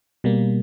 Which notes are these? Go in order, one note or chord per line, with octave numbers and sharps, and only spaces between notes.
B2 G3 A#3